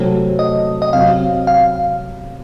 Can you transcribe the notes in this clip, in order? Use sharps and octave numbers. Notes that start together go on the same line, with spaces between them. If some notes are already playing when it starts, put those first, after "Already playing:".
Already playing: C3 F#3 A3 C4
D#5
D#5
C3 F#3 C4 F5
F5